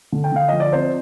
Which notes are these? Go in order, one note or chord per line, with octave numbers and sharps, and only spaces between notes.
D3
G5
D3 F5
F3 D#5
D5
C4 C5